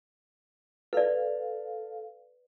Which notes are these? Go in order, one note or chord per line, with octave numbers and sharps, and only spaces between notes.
A4 B4 D5 F5